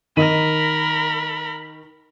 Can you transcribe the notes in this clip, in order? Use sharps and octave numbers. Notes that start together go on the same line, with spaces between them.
D#3 A#4 D#5 B5 D#7